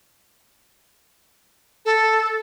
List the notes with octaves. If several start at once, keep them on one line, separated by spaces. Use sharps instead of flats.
A4